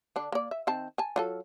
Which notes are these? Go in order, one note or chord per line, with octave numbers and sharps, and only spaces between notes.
D3 D4
A#3 D5
E5
D#3 C4 A5
G#5 A5
F#3 F4 A4